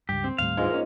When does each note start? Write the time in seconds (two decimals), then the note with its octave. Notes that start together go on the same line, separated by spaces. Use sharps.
0.09 C#2 G2 G4
0.24 C4
0.38 D#2 A2 G3 F5
0.57 G#2 E3 G#3 F4
0.71 A#3 C#4